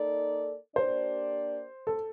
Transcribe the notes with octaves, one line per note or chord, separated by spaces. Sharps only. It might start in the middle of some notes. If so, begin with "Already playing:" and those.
Already playing: A#3 D#4 A4 D5
A#3 D4 G4 C5 D5
A4